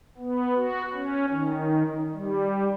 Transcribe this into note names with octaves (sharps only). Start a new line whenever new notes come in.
B3
F#4
C#4
D#3
G3